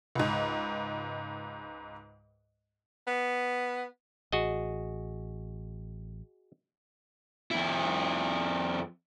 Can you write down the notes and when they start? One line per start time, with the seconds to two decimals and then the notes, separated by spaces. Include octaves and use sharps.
0.15 C#2 G#2
3.07 B3
4.32 A1 F#4 G#4 D#5
7.51 F2 E4